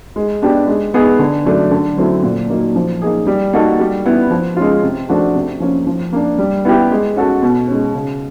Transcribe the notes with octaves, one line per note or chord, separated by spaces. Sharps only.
G#3
B3 D4 G4
G#3
B3 D#4 G#4
D3
F#3 A3 D4
D3
F#3 A3 C4 E4
A#2
F#3 A#3 D#4
F3
A#3 D#4 G#4
G3
A#3 D#4 F#4 A4
G3
B3 E4
F3
G#3 C#4 F4
C3
F3 A3 D4 F#4
C3
F3 A#3 C#4
F3
A#3 D4
G3
B3 E4 G4
G#3
C#4 F#4 A4
B2
G#3 C#4
C#3